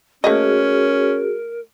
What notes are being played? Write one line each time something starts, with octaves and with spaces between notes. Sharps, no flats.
A3 A#3 C#4 F#4 G#4 A#4 D#5